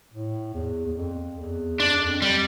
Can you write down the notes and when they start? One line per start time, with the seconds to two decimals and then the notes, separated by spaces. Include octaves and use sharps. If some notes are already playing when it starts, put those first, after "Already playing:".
0.13 A2
0.54 E2
0.86 E2
0.97 F2
1.39 E2
1.80 F2 D4
1.92 E2
2.05 F2
2.22 G3